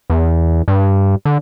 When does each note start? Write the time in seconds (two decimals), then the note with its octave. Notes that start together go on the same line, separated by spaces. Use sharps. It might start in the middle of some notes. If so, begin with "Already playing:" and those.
0.10 E2
0.68 G2
1.25 D3